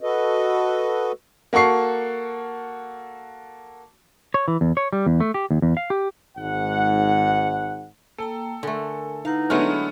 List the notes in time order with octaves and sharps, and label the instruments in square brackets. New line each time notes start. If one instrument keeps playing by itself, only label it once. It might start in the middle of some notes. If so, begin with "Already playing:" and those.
[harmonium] F#4 A4 B4 D#5
[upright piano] A#3 F#4 A4 C#6 C7
[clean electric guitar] C#5
E3
E2
C#5
G3
E2
A3
G4
D#2
E2
F5
G4
[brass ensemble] G#1 G#2 F#5
[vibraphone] A#3 G5 A#5 [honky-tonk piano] A4
[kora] D3 A3 [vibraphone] A#4 G#5
[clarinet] D#4 [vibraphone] E4 B4 F#5 [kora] F5
[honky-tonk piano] D3 B3 F6 [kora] F#3 G#3 A3